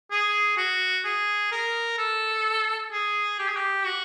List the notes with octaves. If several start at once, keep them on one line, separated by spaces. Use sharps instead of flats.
G#4
F#4
G#4
A#4
A4
G#4
G4
G#4
G4
F#4